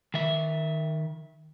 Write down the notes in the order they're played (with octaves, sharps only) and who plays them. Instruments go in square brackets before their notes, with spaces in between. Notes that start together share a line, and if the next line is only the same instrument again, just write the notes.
[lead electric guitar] D#3 E5